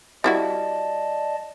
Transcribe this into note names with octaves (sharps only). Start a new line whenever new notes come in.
G3 E4 F#4 D5 D#5 A5